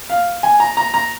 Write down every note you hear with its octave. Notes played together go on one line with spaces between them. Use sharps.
F5
G#5
A#5
A#5
A#5